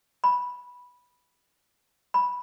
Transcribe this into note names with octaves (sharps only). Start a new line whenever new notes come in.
B5
B5